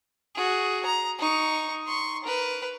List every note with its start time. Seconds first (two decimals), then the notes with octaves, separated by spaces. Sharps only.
0.35 F#4 G#4
0.86 A#5
1.19 D#4 C#6
1.87 C6 C#6
2.24 A#4 B4